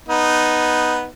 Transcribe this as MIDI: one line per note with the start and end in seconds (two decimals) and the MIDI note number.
0.09 1.07 59
0.09 1.07 63